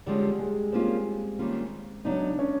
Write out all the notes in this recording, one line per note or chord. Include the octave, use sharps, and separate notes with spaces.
D3 F3 G3 G#3 C#4
G#3
F3 A#3 C4 C#4 F4
D#3 G3 A#3 C#4 F4
C#3 F#3 B3 D4 D#4
C#4